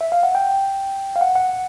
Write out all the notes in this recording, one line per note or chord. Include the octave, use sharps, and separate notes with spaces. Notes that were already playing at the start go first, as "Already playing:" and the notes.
E5
F5
F#5
G5
F5
F#5
F#5